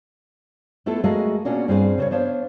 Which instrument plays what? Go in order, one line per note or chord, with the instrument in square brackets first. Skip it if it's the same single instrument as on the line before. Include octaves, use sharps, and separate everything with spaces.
[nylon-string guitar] A3 B3 E4 F4 A4
G#3 A3 F#4 G#4 A#4 F5
B2 A#3 C#4 D4 F4 F#4
G2 C4 F4 G#4 C5 F5
C#3 C5 C#5
B3 D4 C5 C#5 F5